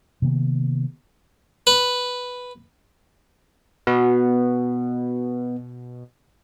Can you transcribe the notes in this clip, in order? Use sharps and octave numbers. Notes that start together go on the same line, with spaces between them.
C3 D#3 A#3 B3
B4
B2 B3